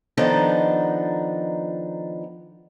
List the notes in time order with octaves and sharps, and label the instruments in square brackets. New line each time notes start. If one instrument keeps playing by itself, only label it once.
[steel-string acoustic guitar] D#3 F3 B3 D4 D#4 A4